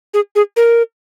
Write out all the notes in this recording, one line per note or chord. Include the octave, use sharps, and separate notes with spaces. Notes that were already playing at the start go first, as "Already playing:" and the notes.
G#4
G#4
A#4